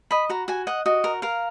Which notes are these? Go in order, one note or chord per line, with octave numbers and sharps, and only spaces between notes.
D#5 B5
F#4 A#5
F#4 G#5
D#5 F#5
F#4 D#5
A#4
A#4 F5